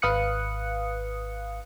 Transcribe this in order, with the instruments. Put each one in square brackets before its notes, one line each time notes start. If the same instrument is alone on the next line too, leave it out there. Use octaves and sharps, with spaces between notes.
[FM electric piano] G#1 B4 F5 D#6 F#6 C#7